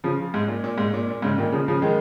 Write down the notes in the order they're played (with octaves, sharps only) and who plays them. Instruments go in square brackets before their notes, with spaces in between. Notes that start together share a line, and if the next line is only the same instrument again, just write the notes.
[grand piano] C#3 F3
G#2
A#2
A#2
G#2
A#2
A#2
G#2 C#3
A#2 D#3
C#3 F3
C#3 F3
D#3 G#3